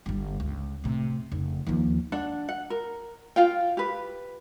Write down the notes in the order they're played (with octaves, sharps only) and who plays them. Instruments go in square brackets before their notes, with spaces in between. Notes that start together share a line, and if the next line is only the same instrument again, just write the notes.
[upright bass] G1 G3
C#2
A2 C3
F1 C#3
D#2 F3
[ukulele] D4 F#5
F#5
A#4
F4 F5 G5
G4 B4